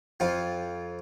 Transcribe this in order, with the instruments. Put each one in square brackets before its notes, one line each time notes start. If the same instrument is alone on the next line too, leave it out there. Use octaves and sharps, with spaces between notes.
[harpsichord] F2 F4